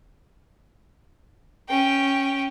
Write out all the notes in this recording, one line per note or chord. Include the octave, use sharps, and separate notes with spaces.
C#4 G5